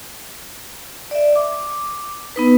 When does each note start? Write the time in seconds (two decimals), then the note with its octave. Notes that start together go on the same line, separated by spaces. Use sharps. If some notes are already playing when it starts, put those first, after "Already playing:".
1.11 D5 E5
1.36 D6
2.36 B3 D#4 B4